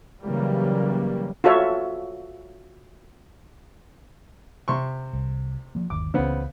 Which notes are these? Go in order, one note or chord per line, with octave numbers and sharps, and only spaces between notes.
C#3 E3 F#3 G3 A#3
F4 F#4 A4 C#5 E5
C3 C6 C#6
C2
F3 A#3
G1 D#2 D6
C#2 C#3 E3 B3 C4